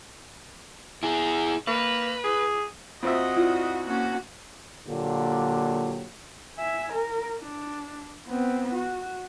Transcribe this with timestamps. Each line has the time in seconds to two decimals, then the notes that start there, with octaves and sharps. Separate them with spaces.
1.03 E4 G#4
1.67 A#3 B4
2.24 G#4
3.03 F2 C4 F#4 D#5 E5
3.36 E4 F4 D5
3.87 A#3 C#4 F#4
4.87 A#2 D3 F#3 A#3 G4
6.58 E5 G#5
6.93 A#4
7.41 D4
8.27 B3 C4
8.75 F#4